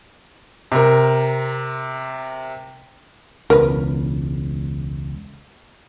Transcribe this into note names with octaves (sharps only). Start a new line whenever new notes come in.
C3 A#4
E1 C#2 A#4 B4